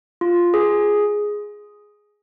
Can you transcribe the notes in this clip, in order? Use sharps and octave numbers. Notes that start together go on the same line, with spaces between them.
F4
G#4